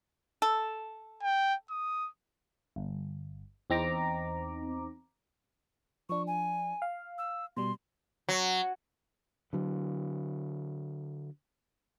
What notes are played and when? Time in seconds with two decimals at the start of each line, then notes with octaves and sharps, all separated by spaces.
0.42 A4
1.23 G5
1.70 D#6
2.76 G1
3.70 E2 C4 D#4 A#5 D6
6.09 F3 D4 C#6
6.27 G#5
6.82 F5
7.18 E6
7.57 B2 G3 C6
8.29 F#3
9.53 D3 F#3